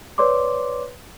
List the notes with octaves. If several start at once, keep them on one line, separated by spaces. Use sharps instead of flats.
B4 C#5 D5 C6 D6